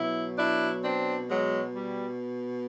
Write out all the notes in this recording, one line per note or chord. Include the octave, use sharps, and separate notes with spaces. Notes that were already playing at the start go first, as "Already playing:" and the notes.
Already playing: B2 F#3 E4
D4 E4
C4 D4
F#3 G#3
G3